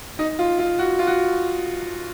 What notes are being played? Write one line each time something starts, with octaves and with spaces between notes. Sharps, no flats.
D#4
F4
F4
F#4
F4
F#4